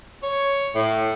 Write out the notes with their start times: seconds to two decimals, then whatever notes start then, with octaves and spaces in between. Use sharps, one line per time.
0.23 C#5
0.75 A2